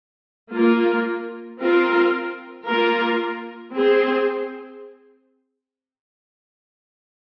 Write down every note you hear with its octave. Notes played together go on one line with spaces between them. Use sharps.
A#3 F4 A#4
C4 F4 A#4
A#3 F4 A#4
C4 G#4 C5